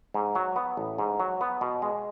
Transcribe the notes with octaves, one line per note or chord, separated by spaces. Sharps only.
G#2
F#3
B3
A1
G#2
F#3
B3
B2
G#3